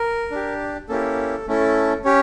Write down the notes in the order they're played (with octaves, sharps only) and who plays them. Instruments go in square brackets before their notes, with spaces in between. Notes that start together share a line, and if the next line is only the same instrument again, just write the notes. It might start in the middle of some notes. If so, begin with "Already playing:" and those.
Already playing: [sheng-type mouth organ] A#4
D4 G4
A#3 C#4 E4 G4 A4
A3 C#4 E4 A4
C#4 G4 C#5